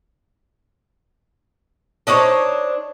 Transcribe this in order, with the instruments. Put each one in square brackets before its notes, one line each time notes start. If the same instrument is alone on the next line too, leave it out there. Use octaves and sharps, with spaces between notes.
[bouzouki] D4 D#4 C5 C#5